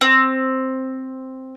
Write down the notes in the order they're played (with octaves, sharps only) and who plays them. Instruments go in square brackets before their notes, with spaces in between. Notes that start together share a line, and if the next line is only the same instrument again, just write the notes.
[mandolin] C4